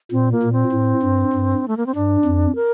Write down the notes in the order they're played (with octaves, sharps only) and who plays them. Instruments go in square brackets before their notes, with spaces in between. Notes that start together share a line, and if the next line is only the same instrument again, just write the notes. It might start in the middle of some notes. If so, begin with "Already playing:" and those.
[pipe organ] A#2 [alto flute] C4
[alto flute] A#3
[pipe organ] A#2
[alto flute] C4
[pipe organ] A2
G2
G2
[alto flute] A3
A#3
C4
[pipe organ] G2 [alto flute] D4
[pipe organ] F2
[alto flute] A#4